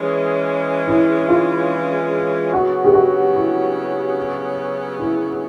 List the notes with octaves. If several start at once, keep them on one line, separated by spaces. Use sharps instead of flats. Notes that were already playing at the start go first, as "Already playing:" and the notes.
Already playing: E3 G#3 C#4
E4
F4
C#3 F#3 B3 F#4
G4
F#4
E4
E4